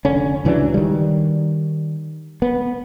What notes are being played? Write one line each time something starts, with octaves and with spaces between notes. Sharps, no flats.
F1 D3 C#4
C#2 E3 F#3 D4
D#3 G3
B3